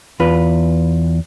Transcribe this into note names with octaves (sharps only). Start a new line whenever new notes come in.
E2 F4 B4